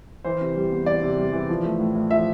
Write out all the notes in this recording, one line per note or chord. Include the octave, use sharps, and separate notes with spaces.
E3 C5
C3
G3
E2
G3 D5
C3
G3
E3
F3
A3
A2
A2
F3 E5